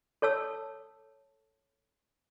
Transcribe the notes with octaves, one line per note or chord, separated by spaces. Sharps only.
A4 C#5 A5 E6